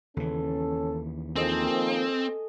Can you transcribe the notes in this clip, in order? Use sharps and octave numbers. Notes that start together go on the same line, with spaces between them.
D#2 C#3 E3 C#4 A4
D#3 F3 A#3 C4 G#4 A4 D#5